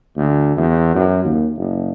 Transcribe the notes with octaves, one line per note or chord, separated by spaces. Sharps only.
D2
E2
F#2
D#2
F#1